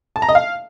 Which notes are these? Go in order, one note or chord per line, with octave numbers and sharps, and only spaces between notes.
A5
A#5
D#5
F5